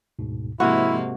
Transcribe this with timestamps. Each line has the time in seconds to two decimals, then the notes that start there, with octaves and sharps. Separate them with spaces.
0.19 D2 G#2 B2
0.60 G#2 C3 F3 A#3 E4 F#4 C6 F6